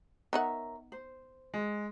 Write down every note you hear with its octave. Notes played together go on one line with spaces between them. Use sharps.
B3 D#4 A#4 C#5 E5 F#5
C5
G#3